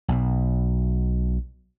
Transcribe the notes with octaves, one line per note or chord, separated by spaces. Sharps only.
B1 B2